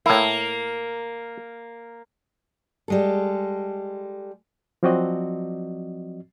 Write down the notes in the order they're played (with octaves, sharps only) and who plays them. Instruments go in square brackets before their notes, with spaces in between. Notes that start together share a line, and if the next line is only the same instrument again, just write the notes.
[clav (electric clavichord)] A2 E4 [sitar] A#3
[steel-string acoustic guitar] G3 G#3 A4
[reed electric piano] F3 F#3 C4 F#4 D5 D#5